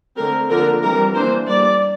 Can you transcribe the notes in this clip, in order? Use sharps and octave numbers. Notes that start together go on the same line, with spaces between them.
D3 A3 C4 A#4
D3 F3 A#3 D4 A#4
E3 G3 C4 A#4
E3 A#3 D4 C5
G3 A#3 D4 D5